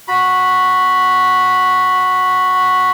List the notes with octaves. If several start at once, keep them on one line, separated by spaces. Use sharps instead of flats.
F#4 B5